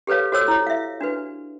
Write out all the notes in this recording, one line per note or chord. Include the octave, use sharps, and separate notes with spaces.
G4 A4 B4 C#5 F5
F#4 A4 C5 C#5 E6
E4 C#5
E5 F5
D4 F#4 B4